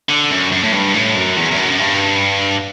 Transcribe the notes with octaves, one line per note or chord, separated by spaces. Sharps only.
D3
F#2
F#2
A2
G2
A2
F#2
E2
E2
F#2
F#2
G2